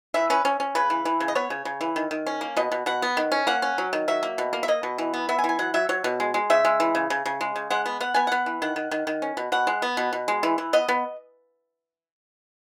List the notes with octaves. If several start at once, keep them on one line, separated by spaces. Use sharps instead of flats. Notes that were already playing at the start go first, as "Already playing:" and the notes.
E3 E5
C#4 B4
C#4
C#4
C#3 B4
E3
E3
C#3
D#5
B3 C#5
C#3
C#3
E3
D#3
D#3
C#4
A#3
B2 D#5
B2
B2 F#5
B3
D#3
C#4
A#3 F#5
C#4
F#3
D#3
F#3 E5
A#3
B2
A#3
E5
A#3 D#5
B2
E3
B3
B3 E5
G#5
E3
G#5
F#3 F#5
F#3 E5
F#3 C#5
B2
G#3
G#3
C#3 E5
G#3
E3
C#3
C#3
C#3
G#3
C#3
G#3 F#5
B3
B3 F#5
B3 G#5
B3 F#5
E3
D#3 F#5
D#3
D#3
D#3
C#4
B2
B2 F#5
G#3
B3
B2
B2
G#3
E3
E3
B3 D#5
B3